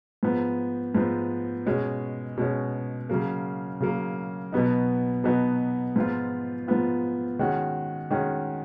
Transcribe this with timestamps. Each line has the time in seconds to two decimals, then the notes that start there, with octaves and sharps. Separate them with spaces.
0.23 G#2 F3 B3
0.95 G#2 F3 B3
1.66 B2 G#3 C#4
2.37 B2 G#3 C#4
3.09 C#3 F#3 A#3
3.81 C#3 F#3 A#3
4.52 B2 F#3 B3 D#4
5.24 B2 F#3 B3 D#4
5.96 G#2 F3 B3 F4
6.68 G#2 F3 B3 F4
7.39 D#3 G#3 C#4 F#4
8.11 D#3 G#3 C#4 F#4